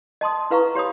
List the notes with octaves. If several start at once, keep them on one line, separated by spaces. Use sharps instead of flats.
D#5 A5 C6 D#6
E4 B4 F5 A#5 C#6
G4 C#5 B5 D#6